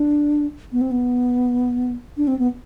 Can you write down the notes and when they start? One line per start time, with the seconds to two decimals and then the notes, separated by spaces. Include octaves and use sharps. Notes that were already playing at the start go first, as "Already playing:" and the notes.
Already playing: D4
0.72 B3
0.81 C4
0.91 B3
2.17 D4
2.27 C4
2.39 B3